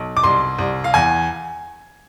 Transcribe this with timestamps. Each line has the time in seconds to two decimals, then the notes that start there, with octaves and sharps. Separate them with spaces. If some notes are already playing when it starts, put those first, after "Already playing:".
Already playing: B1
0.17 D6
0.24 C2 C6
0.59 C2
0.84 F5
0.94 E2 G#5